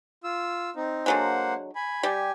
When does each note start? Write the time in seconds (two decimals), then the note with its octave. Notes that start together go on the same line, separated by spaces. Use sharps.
0.24 F4 E6
0.76 C4 D#4
1.06 D3 F#3 G#3 A#3 C5 F#5
1.75 G#5 B5
2.03 G3 G4 G#5